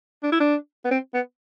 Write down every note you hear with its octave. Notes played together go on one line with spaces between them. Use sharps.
D4
E4
D4
B3
C4
B3